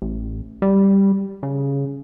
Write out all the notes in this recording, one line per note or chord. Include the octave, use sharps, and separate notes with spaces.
A1
G3
C#3